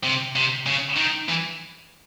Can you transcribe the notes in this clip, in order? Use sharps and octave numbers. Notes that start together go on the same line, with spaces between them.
C3
C3
C#3
D#3
E3